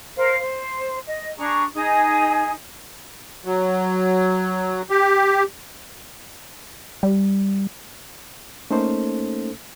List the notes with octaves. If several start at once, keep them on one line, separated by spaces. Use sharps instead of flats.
A#4 C5 F5
C5
D#5
D4 G#4 A#5 C#6
D#4 G#4 G#5 D#6
F#3
G4
G3
A3 A#3 C#4 D#4 A4 C5